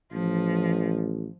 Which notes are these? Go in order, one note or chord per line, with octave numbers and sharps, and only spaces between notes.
A1 F3